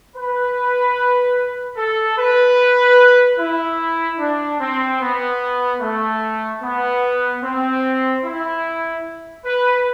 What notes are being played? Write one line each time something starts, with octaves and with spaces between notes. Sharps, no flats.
B4
A4
B4
E4
D4
C4
B3
A3
B3
C4
E4
B4